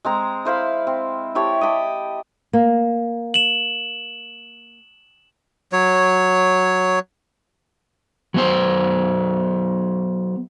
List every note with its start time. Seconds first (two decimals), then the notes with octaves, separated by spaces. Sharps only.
0.05 G#3 C4 A#5
0.45 E4 C5 F5 B5
0.87 C4
1.35 E4 G4 C#5 A5
1.61 D#5 A5 B5 D6
2.53 A#3
3.34 E7 F#7
5.72 F#3 C#5
8.34 F#3 B3 C5